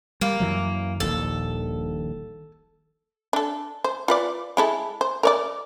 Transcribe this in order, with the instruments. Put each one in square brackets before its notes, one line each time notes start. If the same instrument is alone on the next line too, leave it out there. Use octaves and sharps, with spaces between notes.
[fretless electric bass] G3 [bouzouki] A#3
[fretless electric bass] F#2 E3 F#3
[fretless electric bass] D#1 A#1 D#2 [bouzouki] A4
[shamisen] D4 A4
C5
F4 B4 D5
G#3 E4 A4
C5
A#4 C#5 D5